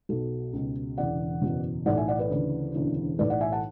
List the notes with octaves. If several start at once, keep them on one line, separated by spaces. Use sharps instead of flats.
B1 B2 F#4 A4
C#2 B2
E1 E2 C#3 E3 D5 F#5
F#1 E2 B2
B1 A2 E3 D5 F#5
E5 G#5
D5 F#5
B4 D5
D2 C#3 E3
E1 D2 C#3 E3
B1 A2 E3 B4 D5
D5 F#5
E5 G#5
F#5 A5